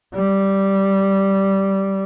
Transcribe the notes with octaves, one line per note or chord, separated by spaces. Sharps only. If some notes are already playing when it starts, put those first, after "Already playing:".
G3